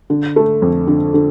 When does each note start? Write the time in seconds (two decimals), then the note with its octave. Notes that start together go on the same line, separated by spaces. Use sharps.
0.10 D3
0.36 A3
0.62 F2
0.88 D3
1.14 D3